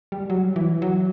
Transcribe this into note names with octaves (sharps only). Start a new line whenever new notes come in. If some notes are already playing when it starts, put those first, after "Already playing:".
G3
F#3
E3
F#3